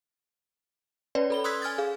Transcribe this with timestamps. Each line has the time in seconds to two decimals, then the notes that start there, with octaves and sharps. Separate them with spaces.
1.15 C#4 B4 C#5 D5
1.30 A4 B5 G7
1.44 C6 D#6 E6 F#6 G#6 B6
1.62 G#5 F6 G#6 A6
1.78 G#4 F5